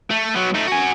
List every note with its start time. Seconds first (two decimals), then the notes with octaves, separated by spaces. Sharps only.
0.11 A3
0.36 F#3 B3
0.55 A3 D#4
0.67 F#4 G#5